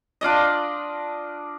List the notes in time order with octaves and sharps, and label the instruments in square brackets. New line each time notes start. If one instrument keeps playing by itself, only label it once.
[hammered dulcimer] D4 F4 D5 D#5